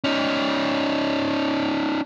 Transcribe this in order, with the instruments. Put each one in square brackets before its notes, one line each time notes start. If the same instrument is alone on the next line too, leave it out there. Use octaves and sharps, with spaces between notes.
[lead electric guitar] C#4 D#4